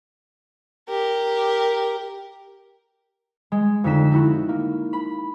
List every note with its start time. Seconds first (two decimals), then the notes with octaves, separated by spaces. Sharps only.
0.88 G4 A#4
3.52 G#3
3.84 F2 D3 D#4 B6 E7
4.12 D#4 E4 F#4
4.49 A#3
4.93 B5